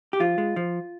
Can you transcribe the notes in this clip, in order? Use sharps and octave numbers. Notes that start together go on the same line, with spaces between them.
G4
F3 F4
G#3
F3